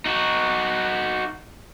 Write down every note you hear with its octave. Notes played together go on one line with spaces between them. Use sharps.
D#4 F#4